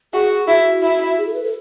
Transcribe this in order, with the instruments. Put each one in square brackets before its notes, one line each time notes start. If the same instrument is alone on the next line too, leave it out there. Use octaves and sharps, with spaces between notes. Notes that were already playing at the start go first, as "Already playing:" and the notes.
[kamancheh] F#4 [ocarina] G#4
[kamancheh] E4 [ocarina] F#4
[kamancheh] E4
[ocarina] G#4
A4
B4
A4